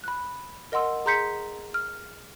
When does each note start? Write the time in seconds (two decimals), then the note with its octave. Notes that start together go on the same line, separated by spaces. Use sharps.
0.04 B5 F#6
0.72 A#4 D#5 F#5 C6 E6
1.06 G#4 A#5 C6 G6 B6 C#7
1.74 F6